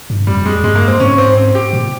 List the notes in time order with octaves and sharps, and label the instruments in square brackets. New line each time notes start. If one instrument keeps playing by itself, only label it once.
[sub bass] G2
[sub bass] F2 [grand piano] G3
[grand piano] G#3
[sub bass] G2 [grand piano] G#3
[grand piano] A#3
C4
[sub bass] G#2 [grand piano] C#4
[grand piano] C4
C4
G4
[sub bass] A#2